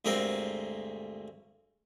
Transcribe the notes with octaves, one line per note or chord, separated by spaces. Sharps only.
D2 G2 G#3 C4 A#4